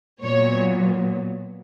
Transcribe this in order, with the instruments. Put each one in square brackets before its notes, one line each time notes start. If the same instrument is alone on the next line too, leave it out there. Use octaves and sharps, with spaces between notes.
[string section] A#2 F#3 B3 C#5